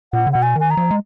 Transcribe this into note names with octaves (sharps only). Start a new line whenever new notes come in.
A#2 F#5
C#3
B2 F#5
G#5
D#3 G#5
A#5
F3
G#3